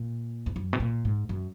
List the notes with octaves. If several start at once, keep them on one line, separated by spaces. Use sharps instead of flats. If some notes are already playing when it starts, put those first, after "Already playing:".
Already playing: A#2
E2
F#2
B2
A#2
G#2
F#2